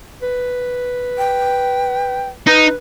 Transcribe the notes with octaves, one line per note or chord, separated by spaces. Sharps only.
B4
G5
D#4 B4